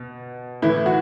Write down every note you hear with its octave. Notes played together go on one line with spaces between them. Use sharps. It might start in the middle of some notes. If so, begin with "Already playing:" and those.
Already playing: B2
A2 E3 E4
F#4